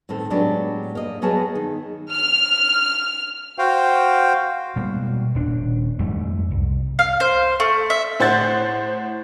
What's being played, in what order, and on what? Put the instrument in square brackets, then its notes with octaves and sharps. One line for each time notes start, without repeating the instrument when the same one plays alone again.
[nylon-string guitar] A2 D#3 C4 A4
A2 F#3 G#3 B3 D4 G4
A#3 D#5
F#3 B3 G#4 A#4 A5
D#3
[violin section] F6
[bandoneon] F#4 C5 F5 G5
[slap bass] B2 G3 G#3 A#3
D#1 D4
F2 G#2 G3 A3
C2
[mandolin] F5
C5
A3
E5
[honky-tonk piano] A2 C5 F#5 A6